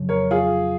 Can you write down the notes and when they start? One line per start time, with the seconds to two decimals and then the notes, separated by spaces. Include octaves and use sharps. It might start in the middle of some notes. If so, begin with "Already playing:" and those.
Already playing: F2 C#3 F#3
0.09 A#4 C#5
0.31 F4 G#4